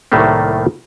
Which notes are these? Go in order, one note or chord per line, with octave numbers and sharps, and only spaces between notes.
C2 A2 D#3 G3 A3 A#3